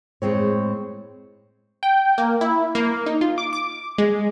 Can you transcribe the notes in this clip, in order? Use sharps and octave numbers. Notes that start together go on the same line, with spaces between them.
A2 G#3 C4 C#5
G5
A#3
E4
A#3
D#4
F4
D6
D6
G#3